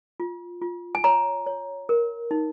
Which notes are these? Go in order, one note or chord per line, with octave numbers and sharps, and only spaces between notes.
F4
F4
G#5
C#5 A#5
C#5
A#4
D#4